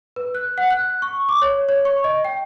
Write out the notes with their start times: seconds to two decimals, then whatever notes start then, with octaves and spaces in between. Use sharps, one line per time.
0.16 B4
0.35 F#6
0.58 F#5
0.70 F#6
1.02 C#6
1.29 D6
1.42 C#5
1.69 C#5
1.85 C#6
2.04 D#5
2.24 G5